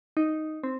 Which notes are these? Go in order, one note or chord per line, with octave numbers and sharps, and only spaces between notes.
D#4
C4